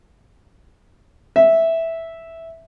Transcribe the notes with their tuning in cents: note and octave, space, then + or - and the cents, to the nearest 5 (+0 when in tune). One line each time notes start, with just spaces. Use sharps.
E5 -5